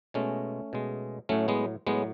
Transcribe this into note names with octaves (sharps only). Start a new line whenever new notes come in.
B2 G#3 A3 C#4
B2 G#3
A2 F#3 A3 C#4
G#3 B3
A2 F#3 G#3 B3